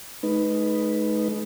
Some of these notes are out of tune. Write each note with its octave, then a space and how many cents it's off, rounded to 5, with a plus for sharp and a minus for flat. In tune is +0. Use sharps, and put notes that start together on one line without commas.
G#3 +45 D#4 +0 B4 +0